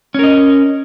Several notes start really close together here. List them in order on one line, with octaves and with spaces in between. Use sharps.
C#4 A#4 D#5